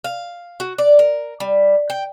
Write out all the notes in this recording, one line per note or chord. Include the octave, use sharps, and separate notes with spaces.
F5
F#4
D5
A#4
G3
G5